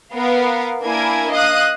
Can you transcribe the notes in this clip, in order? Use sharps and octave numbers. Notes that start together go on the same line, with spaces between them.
B3 A#4 F5
A#3 D4 E4 A#4 G#5 G#6
D#5 F5 D#6 F#6